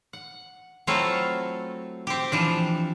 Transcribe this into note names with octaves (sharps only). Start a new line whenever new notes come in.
F#5
F#3 A3 C4 E4 F4 A4
C4 G4
E3 F3 D4